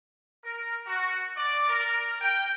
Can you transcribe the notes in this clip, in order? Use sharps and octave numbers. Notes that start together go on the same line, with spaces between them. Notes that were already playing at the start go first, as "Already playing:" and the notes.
A#4
F#4
D5
A#4
G5